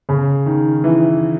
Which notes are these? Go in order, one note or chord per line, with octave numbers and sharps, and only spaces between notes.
C#3
D#3
E3